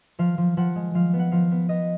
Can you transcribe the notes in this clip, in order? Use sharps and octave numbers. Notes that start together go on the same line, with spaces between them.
F3 F5
F3
F3 F#5
G#3
F3 F5
B3
F#5
F3 F5
B3
B3 D#5